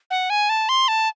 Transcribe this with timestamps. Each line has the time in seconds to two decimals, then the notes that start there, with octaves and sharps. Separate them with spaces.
0.11 F#5
0.30 G#5
0.49 A5
0.69 C6
0.88 A5